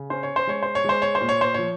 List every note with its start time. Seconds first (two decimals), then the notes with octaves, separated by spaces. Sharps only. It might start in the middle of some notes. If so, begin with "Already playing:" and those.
Already playing: C#3
0.10 C#4 C5
0.23 C#5
0.36 C5
0.47 G#3 C#5
0.63 C5
0.75 C#5
0.84 G#3 C5
1.02 C#5
1.15 C5
1.21 A#2
1.29 C#5
1.41 C5
1.54 F3 C#5